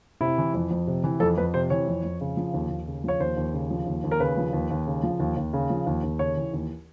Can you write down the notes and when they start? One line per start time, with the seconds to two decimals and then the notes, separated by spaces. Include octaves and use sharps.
0.21 C3 E4
0.38 E3
0.54 F2
0.71 F2
0.87 C3
1.04 E3
1.20 F2 A4
1.38 F2 B4
1.54 C3 C5
1.70 E3 C#5
1.87 F2
2.04 F2
2.21 C#3
2.37 F3
2.54 D#2
2.70 D#2
2.87 C#3
3.04 F3 C#5
3.20 D#2 C5
3.37 D#2
3.54 C#3
3.70 F3
3.87 D#2
4.04 D#2
4.11 A#4
4.20 C#3 B4
4.37 F3
4.53 D#2
4.71 D#2
4.87 C#3
5.03 F3
5.20 D#2
5.37 D#2
5.53 C#3
5.70 F3
5.87 D#2
6.03 D#2
6.19 C#3 C#5
6.37 E3
6.53 D#2